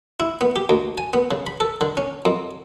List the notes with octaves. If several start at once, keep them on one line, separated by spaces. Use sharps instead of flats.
E4
B3
G4
D2
G#5
B3
C#3
B5
A4
D3
C#4
F2